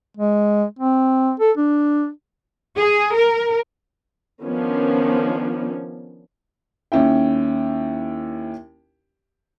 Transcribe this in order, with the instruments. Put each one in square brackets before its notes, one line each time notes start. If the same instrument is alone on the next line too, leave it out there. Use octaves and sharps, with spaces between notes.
[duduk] G#3
C4
A4
D4
[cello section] G#4
A#4
[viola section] D#3 F3 B3 C#4 D4
[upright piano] D#2 C#4 E4 G5